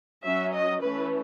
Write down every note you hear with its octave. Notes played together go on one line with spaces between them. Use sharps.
F#3 C#4 E5
D#5
E3 A3 C#4 B4